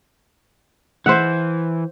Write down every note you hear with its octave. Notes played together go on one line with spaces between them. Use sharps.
E3 C5 E5 F#5